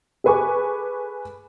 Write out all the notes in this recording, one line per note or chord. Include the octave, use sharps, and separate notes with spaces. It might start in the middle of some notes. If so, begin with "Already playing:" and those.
G#4 A4 B4 G#5 C#6 D6